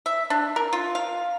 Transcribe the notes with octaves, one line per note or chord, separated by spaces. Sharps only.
E5
D4
A#4
F4
F5